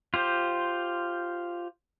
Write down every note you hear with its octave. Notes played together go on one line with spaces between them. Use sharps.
F4 G4 C5